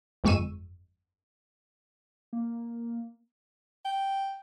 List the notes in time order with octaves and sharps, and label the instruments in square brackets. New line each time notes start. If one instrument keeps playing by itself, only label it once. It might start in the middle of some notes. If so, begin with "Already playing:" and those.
[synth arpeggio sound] G1 F2 G#3 C#6 E6 D#7
[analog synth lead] A#3
[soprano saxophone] G5